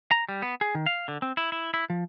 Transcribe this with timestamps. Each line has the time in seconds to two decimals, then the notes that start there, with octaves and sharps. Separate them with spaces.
0.11 A#5
0.29 G3
0.42 B3
0.61 G#4
0.75 D#3
0.86 F5
1.08 D3
1.22 C4
1.37 E4
1.52 E4
1.74 E4
1.90 F3